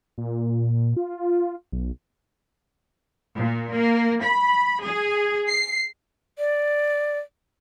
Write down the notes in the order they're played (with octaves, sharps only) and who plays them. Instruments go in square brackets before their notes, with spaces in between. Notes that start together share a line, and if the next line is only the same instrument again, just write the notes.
[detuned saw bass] A#2
F4
B1
[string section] A#2
A#3
B5
G#4
C7
[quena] D5